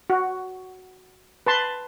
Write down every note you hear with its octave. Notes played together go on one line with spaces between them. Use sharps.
F#4
B4 A5 C6